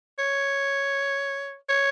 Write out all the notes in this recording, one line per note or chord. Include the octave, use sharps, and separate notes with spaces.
C#5
C#5